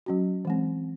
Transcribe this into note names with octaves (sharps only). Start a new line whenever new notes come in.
F#3 C#4 F#4
E3 G#3 C4